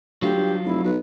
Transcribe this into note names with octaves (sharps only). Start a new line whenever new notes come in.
D2 F#3 F4 G4
G2
F1 E4
B1 B4